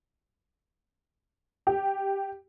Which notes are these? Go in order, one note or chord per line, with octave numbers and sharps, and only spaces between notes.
G4